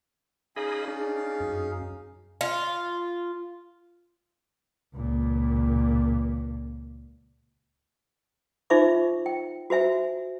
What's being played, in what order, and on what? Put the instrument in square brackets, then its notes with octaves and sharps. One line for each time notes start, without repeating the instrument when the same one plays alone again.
[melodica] C#4 D#4 F5 [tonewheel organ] G#4 D#5 B5
[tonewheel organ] D4 [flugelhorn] G#4
[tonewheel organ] F#2
[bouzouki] F4
[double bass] C#2 A#2
[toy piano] D#4 F4 C5 E5 C#6 D6
G5
F#4 C5 E5 G#5